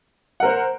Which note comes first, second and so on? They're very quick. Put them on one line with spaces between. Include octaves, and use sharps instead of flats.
F#5 A#4 C5